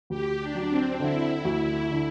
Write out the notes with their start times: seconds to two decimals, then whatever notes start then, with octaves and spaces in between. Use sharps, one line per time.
0.10 D2 G4
0.40 D4
0.55 F#3
0.70 C4
1.00 D3 E4
1.45 D2
1.91 D3